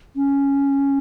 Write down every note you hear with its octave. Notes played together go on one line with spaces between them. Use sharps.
C#4